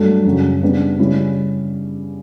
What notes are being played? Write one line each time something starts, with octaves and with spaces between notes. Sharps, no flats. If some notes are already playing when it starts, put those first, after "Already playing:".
Already playing: G2 F#3 A3 D4
F#2 C#3 F#3
C#3 G3 B3 D4
C#3 G3 C#4 E4